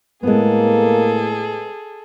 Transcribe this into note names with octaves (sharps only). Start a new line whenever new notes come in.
A2 G#3 A#3 B3 G#4 A4